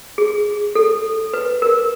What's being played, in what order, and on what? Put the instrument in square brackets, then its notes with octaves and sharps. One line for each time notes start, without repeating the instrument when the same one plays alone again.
[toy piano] G#4
A4
B4
A#4